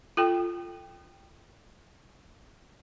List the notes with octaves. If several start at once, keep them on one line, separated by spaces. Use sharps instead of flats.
F4 A4 G5